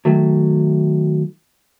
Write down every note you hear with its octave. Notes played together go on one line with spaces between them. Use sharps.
D#3 F#3 A3